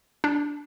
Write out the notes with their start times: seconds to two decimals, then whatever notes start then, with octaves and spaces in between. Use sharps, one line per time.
0.24 D4